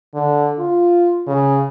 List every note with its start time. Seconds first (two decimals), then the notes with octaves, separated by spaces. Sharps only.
0.14 D3
0.59 F4
1.27 C#3